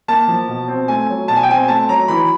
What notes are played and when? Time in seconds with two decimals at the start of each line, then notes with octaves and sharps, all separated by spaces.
0.08 A#3 A5
0.28 F3
0.48 B2
0.68 C4
0.88 A3 G#5
1.09 F#3
1.28 B2 A5
1.36 G#5
1.43 G5
1.49 C4 G#5
1.68 A3 A5
1.89 F#3 A#5
2.08 E3 B5